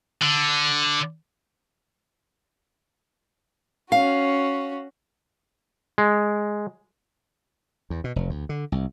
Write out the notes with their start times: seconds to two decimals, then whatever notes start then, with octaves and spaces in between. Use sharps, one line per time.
0.22 D3
3.92 C#4 F#4 F5
5.98 G#3
7.90 E2
8.04 B2
8.16 F1
8.29 D2
8.49 D3
8.72 C2